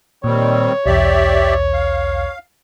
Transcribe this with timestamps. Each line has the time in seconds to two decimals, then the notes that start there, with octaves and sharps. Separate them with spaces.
0.24 A#2 D#3 G3 C4 C#5
0.86 B1 E2 G4 D5 E5
1.73 F5